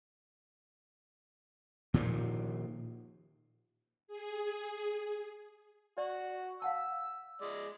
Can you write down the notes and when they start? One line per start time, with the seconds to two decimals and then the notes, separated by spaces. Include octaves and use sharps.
1.94 A#2 D#3 F3
4.08 G#4
5.98 F#4 D5
6.62 F5 F#5 A5 E6
7.41 G#3 D5